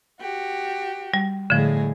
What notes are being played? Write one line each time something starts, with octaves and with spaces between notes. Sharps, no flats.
F#4 G4
G3
A2 D3 F3 G#3 G#4